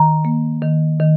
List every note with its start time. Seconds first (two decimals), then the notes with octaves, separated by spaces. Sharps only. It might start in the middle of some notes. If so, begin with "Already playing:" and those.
Already playing: D#3 A#5
0.25 A#3
0.62 D#3
1.00 D#3